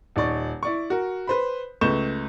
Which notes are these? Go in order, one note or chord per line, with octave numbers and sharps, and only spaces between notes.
D#1 D#4 D5 C#6
E4 D5 C#6
F#4 A#4
B4 C5 B5
C#2 A3 B4 C#6 G6 E7